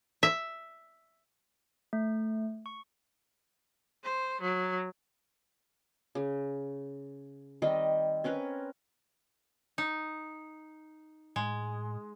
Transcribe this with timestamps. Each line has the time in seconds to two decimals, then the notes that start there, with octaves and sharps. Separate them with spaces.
0.23 E5
1.93 A3
2.66 C#6
4.04 C5
4.42 F#3
6.15 C#3
7.62 D#3 G3 C4 D#5
8.24 C4 C#4 A#4 B4
9.78 D#4
11.36 A2 G#3